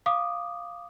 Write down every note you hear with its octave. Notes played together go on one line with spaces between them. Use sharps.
F5 D6 D#6